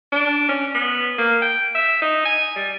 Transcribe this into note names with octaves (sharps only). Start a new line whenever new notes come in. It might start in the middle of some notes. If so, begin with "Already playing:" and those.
D4
C#4
B3
A#3
G5
E5
D#4
G#5
G3